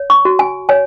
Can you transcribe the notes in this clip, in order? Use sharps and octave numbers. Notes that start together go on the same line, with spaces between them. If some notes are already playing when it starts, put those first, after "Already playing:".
Already playing: C#5
C#6
F#4
G#5
C#5 G#5